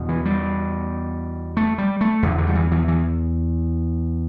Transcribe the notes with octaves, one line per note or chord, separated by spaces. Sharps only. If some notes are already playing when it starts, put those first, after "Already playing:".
Already playing: E2 B2
E3
G3
A3
G3
A3
E2 D3
D3
G3
E3
E3
E3